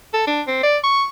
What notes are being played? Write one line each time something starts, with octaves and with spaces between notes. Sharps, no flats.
A4
D4
C4
D5
C#6